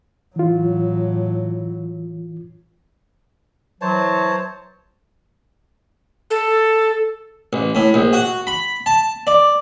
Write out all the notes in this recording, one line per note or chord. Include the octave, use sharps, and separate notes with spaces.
A2 E3 F#3 F4
E3 F#3 C5 C#5 A5
A4
A1
A2
A#1
F#4
B5
A5
D5